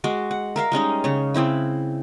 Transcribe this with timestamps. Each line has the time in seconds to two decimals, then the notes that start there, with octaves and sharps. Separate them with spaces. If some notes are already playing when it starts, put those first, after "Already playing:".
0.04 G#3 F#4 D6
0.31 F#5
0.56 A#4 E5 F5
0.72 G3 G#3 C#4 D#4
1.04 C#3 C#5
1.34 C#3 C4 E4 B5